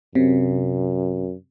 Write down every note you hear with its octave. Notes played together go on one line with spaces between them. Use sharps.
F#2 C3